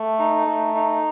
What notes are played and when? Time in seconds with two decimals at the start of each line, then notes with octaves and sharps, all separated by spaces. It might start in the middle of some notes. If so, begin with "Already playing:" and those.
Already playing: A3
0.19 D#4
0.47 A3
0.75 D#4